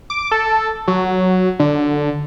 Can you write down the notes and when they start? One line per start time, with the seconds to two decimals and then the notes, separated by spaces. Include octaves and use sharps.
0.10 D6
0.32 A4
0.88 F#3
1.59 D3